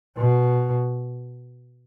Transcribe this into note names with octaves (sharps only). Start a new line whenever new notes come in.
B2